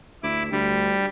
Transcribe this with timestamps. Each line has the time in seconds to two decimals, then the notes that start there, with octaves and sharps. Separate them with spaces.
0.23 D2 E4 D6
0.52 D2 G3